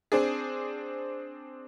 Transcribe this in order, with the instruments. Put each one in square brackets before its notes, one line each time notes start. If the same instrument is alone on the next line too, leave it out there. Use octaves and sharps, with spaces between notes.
[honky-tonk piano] C4 D4 G#4